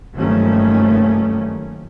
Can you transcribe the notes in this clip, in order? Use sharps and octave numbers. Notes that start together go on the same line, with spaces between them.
F#1 G2 D#3 F3 A3 C#4